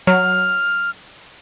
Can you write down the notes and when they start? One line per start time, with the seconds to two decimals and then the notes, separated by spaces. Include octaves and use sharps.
0.07 F#3 F6